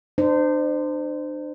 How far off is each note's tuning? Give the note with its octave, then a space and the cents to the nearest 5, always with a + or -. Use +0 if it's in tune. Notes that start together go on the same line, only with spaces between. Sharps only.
D4 +40 C5 -20